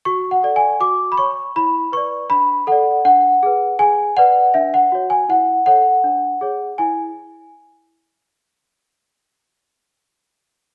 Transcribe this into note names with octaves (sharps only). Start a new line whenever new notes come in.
F#4 C#6
F#5
A4 D5
G#5
F#4 D6
B5
C#5 C#6
E4 B5
B4 D5 C#6
D4 B5
A4 D5 F#5
D4 F#5
G#4 B4
G#4 G#5
B4 D5 F#5
D4 E5
F#5
F#4 C#5
G#5
E4 F#5
A4 C#5 F#5
D4
G#4 C#5
E4 G#5